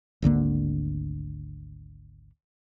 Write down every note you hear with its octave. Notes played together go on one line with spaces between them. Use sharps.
G#1 D2 D3 A#3